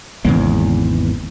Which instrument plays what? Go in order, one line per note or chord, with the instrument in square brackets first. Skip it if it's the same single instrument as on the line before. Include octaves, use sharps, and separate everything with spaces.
[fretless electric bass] G#1 E2 [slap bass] C#3 G#3 A#3